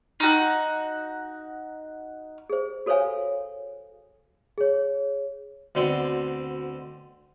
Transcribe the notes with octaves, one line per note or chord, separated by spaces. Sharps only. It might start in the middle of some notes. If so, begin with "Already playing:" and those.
D#4 F#4
G#4 C5
F#4 A4 C5 C#5 F5 G#5
G#4 C#5
D2 B2 D3 C4